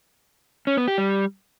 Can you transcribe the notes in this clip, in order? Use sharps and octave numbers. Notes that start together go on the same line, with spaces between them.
C#4
B3
G4
G3